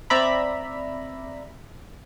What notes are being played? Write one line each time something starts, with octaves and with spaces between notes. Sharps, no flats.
C4 D5 E5 A#5 B5